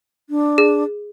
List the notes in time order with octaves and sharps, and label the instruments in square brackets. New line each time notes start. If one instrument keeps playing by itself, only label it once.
[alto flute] D4
[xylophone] G#4